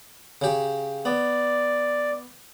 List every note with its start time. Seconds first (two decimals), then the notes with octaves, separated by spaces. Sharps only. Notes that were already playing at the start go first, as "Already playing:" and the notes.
0.41 C#3 G4
1.05 B3 D5